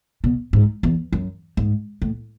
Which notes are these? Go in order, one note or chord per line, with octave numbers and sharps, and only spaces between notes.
B2
G#2
E2
F#2
G#2
A2